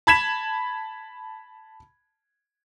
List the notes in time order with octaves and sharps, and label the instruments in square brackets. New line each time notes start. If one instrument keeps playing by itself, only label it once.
[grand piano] A5 B5 G#6 B6 E7